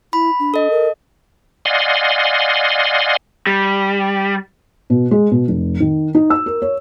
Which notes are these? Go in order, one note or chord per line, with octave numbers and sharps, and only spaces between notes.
E4 B5
D4
A4 D#5
A#4
D5 D#5 F5 F#5 G#5 C6
G3
B2
G#3
B2
F1
D#3
D#4
E6
A#4
C#5